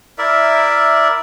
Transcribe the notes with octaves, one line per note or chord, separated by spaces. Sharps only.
E4 A#4 D5 E5